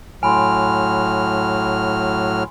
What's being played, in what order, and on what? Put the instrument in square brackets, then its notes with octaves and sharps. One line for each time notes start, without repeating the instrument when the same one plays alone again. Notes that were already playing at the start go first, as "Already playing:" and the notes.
[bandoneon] A2 F#3 F6 [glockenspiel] G#5 B5 C6